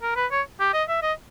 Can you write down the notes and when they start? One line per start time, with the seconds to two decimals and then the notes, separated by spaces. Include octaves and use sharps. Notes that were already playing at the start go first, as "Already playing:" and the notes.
0.02 A#4
0.16 B4
0.31 C#5
0.60 G4
0.74 D#5
0.88 E5
1.02 D#5